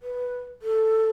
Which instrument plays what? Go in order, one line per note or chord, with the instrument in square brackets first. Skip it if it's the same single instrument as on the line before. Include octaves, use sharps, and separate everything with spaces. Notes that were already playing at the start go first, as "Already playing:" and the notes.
[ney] B4
A4